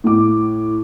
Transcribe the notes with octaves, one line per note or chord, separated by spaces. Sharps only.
A2 D6